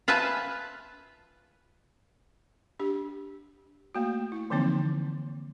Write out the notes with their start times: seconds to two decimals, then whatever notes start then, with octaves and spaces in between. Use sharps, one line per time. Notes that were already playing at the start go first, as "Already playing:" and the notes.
0.08 F4 B4 E5 G#5 A5
2.80 D4 G4
3.95 A3 A#3 F#4
4.32 E4
4.50 D3 E3 F3 A#3 C4 D#4